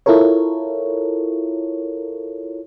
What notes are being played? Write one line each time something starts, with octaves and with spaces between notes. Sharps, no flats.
E4 F4 A4 A#4 C#5